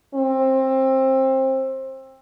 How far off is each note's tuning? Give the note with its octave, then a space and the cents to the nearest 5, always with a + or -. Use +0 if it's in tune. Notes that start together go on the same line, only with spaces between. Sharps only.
C4 +20